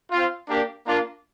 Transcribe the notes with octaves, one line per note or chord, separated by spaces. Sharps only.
C4 F4
A#3 D4 G4
A#3 D4 F4